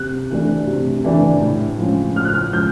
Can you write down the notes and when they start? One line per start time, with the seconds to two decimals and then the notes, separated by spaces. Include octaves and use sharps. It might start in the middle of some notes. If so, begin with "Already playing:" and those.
Already playing: C3 F#6
0.30 E3 A3 D4
0.67 C3
1.04 E3 A3 D4
1.42 A2
1.78 F3 G#3 C#4
2.16 A2 F6
2.25 F#6
2.34 F6
2.53 F3 G#3 C#4 G6